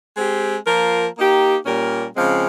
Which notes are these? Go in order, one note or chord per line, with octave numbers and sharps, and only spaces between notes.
G#3 C4 G4
F3 A#3 F4 A#4
A#3 D#4 G4
A#2 G3 C#4 G4 A#4
C#3 F3 G#3 C4